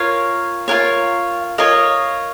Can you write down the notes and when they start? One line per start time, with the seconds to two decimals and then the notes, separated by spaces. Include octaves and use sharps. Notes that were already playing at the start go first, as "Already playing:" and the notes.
Already playing: F4 A#4 C#5 F5
0.68 F4 A#4 C#5
1.58 F4 A#4 C#5 D#5